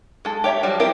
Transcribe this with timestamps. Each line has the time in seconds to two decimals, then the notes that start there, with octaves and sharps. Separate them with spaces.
0.25 G#3 A4
0.44 G4 C#5 E5 A#5
0.63 F3 G3 F#4
0.80 C4 E4 G4 A#4